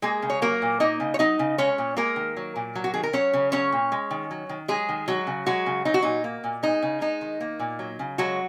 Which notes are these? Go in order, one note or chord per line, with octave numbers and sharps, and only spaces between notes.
G#3 A#3 G#4
C#3
C#5
F#3 A#3 A#4
A#2
A#3 D#4 D#5
C#3
C#5
F#3 D#4 D#5
C#3
G#3 C#4 C#5
A#2
G#3 A#3 A#4
D#3
F#3
A#2
F#3
F#4
D#3 G#4
A#4
F#3 C#4 C#5
C#3
F#3 C#4 C#5
A#2
G#3
D#3
F#3
D#3
F#3 G#3 G#4
D#3
F#3 G#3 F#4
C#3
F#3 G#3 F#4
C#3
F#3 D#4
F#4
A#2 D#4
A#3
A#2
G#3 D#4
C#3
G#3 D#4
D#3
A#3
A#2
F#3
C#3
F#3 G#3 F#4